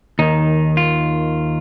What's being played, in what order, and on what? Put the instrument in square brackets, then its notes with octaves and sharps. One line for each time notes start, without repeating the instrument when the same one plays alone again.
[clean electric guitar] D#2 D#3 D#4
F4